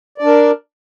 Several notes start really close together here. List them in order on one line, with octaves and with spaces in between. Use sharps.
D5 D4 A#4